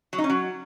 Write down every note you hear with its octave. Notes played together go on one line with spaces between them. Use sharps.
F#3
D#4
C#4
F#3